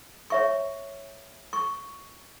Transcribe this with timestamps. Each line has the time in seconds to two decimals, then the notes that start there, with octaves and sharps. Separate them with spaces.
0.30 C#5 E5 C#6
1.53 C#6